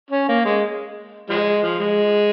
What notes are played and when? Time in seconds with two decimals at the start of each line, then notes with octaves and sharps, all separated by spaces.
0.10 C#4
0.28 A#3
0.45 G#3
1.30 F3 G#3
1.63 F3
1.80 G#3